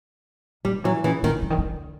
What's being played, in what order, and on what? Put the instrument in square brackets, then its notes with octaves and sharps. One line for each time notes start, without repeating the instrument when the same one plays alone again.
[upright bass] D#3 [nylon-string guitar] G3
[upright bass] E3 [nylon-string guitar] F#3
[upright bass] C#3 [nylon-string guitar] E3
[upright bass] D3 [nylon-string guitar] D#3
[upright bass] D3
D#3
D3